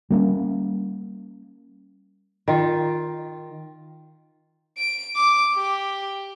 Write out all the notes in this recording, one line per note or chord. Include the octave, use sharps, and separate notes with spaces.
G3 A#3 C4 C#4
D#3 F4
D7
D6
G4